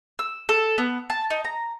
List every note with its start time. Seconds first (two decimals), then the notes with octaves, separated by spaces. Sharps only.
0.19 E6
0.49 A4
0.78 B3
1.10 A5
1.30 D#4
1.44 A#5